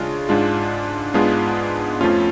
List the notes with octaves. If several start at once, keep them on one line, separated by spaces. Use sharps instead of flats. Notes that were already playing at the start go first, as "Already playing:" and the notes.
Already playing: C#3 G#3 D4 F4
G#2 G#3 D4 F4
G#2 G#3 B3 D4 F4
F2 F3 A3 C#4 F4